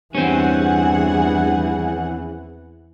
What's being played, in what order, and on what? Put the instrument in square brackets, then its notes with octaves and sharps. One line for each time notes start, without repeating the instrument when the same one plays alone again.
[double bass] E2 E3 [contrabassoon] G2 [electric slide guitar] C4 C#4 [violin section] G#4 F#5